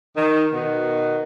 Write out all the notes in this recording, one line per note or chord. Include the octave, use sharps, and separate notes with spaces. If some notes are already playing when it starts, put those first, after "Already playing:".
D#3
B2 D#3 B3 F#4